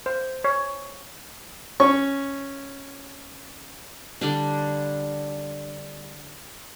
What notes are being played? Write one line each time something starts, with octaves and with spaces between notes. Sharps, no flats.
C5
C#5
C#4 C#6
D3 G3 D4